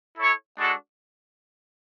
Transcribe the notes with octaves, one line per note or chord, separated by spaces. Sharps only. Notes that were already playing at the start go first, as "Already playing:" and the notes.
E4 A4 C#5
G#3 D4 F#4 A4